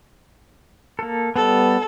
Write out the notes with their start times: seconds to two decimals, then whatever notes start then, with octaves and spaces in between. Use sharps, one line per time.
0.99 A#3 A4
1.36 G3 B3 A4